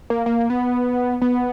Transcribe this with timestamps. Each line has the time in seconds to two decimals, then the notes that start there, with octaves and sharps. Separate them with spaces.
0.10 A#3
0.26 A#3
0.50 B3
1.22 B3